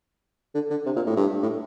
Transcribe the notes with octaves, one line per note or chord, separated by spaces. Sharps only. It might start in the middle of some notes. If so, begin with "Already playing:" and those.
D3
D3
C3
A#2
A2
G2
A2